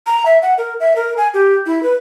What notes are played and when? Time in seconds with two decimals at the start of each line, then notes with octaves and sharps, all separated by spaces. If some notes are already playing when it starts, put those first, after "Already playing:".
0.07 A#5
0.26 E5
0.42 F#5
0.58 A#4
0.80 E5
0.96 A#4
1.17 G#5
1.34 G4
1.66 E4
1.83 B4